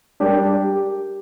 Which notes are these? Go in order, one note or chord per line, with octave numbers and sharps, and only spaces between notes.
G3 D4 G4 A#4
G4